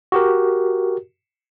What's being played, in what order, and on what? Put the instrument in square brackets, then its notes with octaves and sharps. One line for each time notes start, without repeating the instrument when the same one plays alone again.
[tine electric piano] F#4 G4 A#4